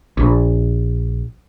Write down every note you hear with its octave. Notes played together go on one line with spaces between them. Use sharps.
A#1